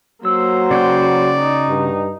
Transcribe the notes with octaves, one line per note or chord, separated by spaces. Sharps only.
F#3 A#3 C5 E6
C#3 F#4 D5 G5
D#4
G2